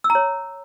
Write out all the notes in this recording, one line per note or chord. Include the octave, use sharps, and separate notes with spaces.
E6
A#5
C#5